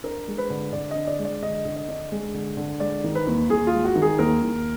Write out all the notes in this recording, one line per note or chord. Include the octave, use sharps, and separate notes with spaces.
D4 A#4
G#3
B4
D3
D3 D5
D4 D#5
D5
G#3
D5
D3 D#5
D3
D#5
D4
G#3
D3
D3
G#3 D5
D#3
B4
D#2
D#2 G#4
F4
G#3
F#4
D#3
G#4
D#2 A#4
D#2